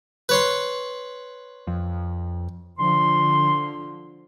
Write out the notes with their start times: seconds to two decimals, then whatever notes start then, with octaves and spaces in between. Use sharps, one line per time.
0.29 B4 C#5 C6
1.67 F2
2.79 D3 F3 C6